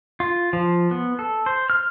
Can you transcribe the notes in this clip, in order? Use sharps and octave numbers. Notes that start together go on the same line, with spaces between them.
F4
F3
B3
A4
C5
F6